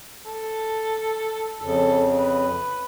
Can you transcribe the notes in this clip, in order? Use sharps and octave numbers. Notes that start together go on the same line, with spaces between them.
A4
F2 C#3 A4
B4